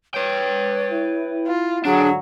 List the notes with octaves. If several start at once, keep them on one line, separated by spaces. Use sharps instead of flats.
B4 C#5 G5
E4
F4
G#2 D3 F#3 D4 G#4